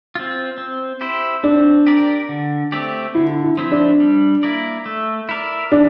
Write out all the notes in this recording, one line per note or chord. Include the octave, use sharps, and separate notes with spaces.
C4 F4
C4
E4 G4 C5
C4 D4
G4 A#4 D5
D3
A3 C4 G4 D5
D3 E4
E4
F3 C4 E4
D4
G3
A#3 E4 A#4 D5
A3
E4 A#4 D5
E3 D4